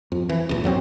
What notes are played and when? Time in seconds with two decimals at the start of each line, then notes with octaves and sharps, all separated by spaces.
0.12 F2
0.29 E3
0.49 D#1 C#2
0.64 F#2 F#3 A3 C4